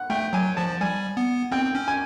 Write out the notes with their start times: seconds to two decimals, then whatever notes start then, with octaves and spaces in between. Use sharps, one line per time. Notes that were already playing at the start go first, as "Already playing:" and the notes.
Already playing: F#5
0.10 A3 G5
0.33 F#3 G#5
0.57 F3 A5
0.81 G3 G#5
1.17 B3
1.52 C4 G5
1.75 C#4
1.88 G#5